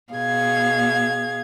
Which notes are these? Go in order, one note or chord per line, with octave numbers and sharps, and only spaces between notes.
B2 G#4 F5 G#6